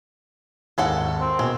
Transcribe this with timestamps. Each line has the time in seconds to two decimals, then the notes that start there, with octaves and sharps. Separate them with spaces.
0.78 G#1 D#2 G#3 A4 F#5
1.20 C4
1.39 B2 G#3 A#3